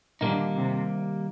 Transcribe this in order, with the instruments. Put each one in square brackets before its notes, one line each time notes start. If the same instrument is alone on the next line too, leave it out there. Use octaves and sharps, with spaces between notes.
[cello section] A#2 D3 [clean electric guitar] D#3 G3 A#3 D#4
[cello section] C3